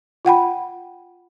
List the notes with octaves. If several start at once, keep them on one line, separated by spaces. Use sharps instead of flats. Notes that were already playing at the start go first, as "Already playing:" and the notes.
F4 F#5 G5 B5